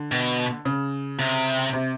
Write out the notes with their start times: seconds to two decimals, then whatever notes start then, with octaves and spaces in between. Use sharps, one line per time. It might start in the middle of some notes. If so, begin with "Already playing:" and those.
Already playing: D3
0.12 B2
0.65 C#3
1.19 C3
1.73 C3